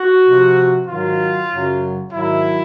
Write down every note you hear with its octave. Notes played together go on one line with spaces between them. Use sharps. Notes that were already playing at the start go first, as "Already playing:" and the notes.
Already playing: F#4
C3 F3
G#2 D#3 F#3 F4
F#2 C#3 F#3
G#2 D#3 F#3 E4